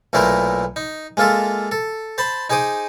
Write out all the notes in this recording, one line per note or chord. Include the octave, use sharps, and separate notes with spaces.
B1 A#2 A3 E4 A#4 C5
D#4
G#3 A#3 F4 A4 E5
A4
C5 A5 B5 C6
D#4 G#4 C5 D6 D#6